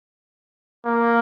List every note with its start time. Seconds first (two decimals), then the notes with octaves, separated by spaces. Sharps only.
0.86 A#3